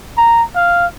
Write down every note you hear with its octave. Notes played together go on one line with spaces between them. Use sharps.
A#5
F5